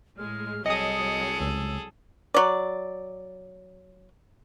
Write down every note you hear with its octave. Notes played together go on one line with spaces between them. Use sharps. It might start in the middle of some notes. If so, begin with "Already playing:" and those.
A2 G#3 F6
C2 F#3 G#4 A4 D#5 D#6 C#7
C#2 E6
F#3 D5